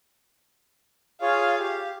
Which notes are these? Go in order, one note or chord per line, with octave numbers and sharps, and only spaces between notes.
F4 G#4 C#5 F5
G4